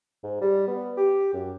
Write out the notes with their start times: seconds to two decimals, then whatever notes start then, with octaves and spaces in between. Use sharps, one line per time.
0.24 G#2
0.41 G3
0.67 B3
0.97 G4
1.33 F#2